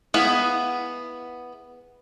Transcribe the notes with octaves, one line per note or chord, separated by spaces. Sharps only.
B3 E4 G#4 F5 F#5